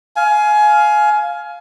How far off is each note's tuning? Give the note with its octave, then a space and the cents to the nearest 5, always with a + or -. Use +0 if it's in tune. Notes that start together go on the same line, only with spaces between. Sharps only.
F5 +0 G#5 +25